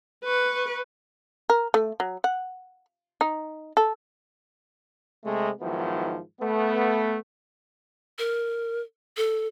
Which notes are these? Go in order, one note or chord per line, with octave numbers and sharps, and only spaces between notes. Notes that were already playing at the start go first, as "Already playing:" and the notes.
B4 C#6
A#4
A3
F#3
F#5
D#4
A4
C3 G#3 A3
G#2 D#3 F3 F#3 B3 E4
A3 B3
A#4
A4